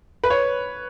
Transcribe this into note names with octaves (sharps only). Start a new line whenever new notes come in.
B4
C#5